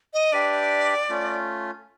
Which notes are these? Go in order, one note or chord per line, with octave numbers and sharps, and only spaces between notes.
D#5
D4 G4 B4 D5 E5 G5
A3 C#4 F4